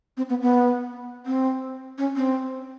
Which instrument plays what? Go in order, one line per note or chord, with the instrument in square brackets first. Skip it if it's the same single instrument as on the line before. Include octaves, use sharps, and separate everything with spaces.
[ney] C4
B3
B3
C4
C#4
C4